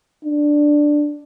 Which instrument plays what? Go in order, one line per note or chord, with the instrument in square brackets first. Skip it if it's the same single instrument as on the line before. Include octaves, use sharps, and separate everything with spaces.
[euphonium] D4